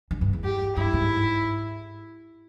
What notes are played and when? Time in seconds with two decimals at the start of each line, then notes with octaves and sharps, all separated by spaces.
0.11 G2
0.21 G2
0.33 E2
0.44 G4
0.77 G2 E4
0.93 G#2